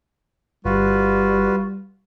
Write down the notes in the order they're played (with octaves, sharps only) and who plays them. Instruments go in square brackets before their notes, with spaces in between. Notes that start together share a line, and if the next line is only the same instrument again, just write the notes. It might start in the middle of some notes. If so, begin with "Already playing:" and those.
[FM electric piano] G1 [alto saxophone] G3 [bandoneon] F4 F#4 B4